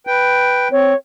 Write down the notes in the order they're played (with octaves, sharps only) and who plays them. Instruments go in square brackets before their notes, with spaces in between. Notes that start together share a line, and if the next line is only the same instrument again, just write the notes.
[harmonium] B4 G5
[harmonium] C4 [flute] C#5